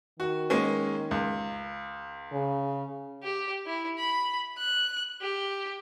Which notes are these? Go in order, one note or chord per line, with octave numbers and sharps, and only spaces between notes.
D#3 F#4
G#3 A#3 C#4
C#2
C#3
G4
E4
B5
F#6
G4